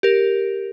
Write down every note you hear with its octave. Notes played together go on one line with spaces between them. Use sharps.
G4 A#4